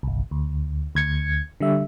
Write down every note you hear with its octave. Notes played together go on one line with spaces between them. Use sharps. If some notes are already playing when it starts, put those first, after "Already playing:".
G1 C2
D2
D2 G#6 C#7
D3 G3 E5